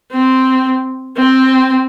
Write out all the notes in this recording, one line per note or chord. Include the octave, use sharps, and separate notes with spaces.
C4
C4